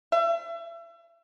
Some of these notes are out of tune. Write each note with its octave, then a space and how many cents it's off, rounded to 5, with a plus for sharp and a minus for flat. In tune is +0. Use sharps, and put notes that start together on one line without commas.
E5 +35